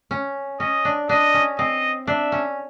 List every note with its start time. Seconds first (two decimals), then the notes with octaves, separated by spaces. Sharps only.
0.11 C#4
0.60 C#4 D#5
0.85 D4
1.09 D4 D#5
1.34 C#4
1.58 C4 D#5
2.07 D4 E5
2.32 C#4